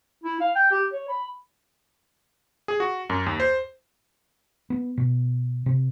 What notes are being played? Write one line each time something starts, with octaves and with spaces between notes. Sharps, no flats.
E4
F5
G5
G4
C#5
B5
G#4
F#4
F#2
D#2
C5
B3
B2
C3